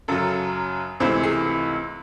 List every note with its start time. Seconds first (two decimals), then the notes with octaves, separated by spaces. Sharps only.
0.08 F#2 C#3 F#3 A4
1.00 C#2 C3 E3 A3 C5
1.23 G#4